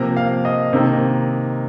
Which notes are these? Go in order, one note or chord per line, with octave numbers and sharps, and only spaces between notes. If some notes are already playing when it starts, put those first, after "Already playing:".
Already playing: C3 F3 A#3 A#5
F5
D#5
C3 D#3 A#3